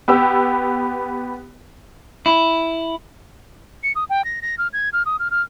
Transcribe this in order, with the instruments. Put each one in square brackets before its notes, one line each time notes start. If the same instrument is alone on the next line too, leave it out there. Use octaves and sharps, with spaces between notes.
[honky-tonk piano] B3 G4 E6
[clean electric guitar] E4
[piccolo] C#7
D#6
G5
A#6
A#6
F6
G#6
F6
D#6
F6
F6